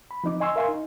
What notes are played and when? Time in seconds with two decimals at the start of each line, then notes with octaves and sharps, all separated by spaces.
0.11 B5
0.24 F3 C4 D#4 D6
0.40 D#5 G#5 C6 C#6 E6
0.56 A#4 E5 F5 G#5 C6 C#6
0.68 D#4